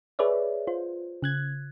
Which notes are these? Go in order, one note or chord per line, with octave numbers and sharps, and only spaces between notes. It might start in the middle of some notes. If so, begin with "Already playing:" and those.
G#4 B4 C#5 D5 E5
F4 C5
C#3 F#6 G#6